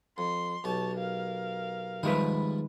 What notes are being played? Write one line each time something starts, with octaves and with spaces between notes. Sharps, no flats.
F2 C6
B1 G4 C#5 A5
A#4 F5
D#3 F3 G3 G#3 E4 B4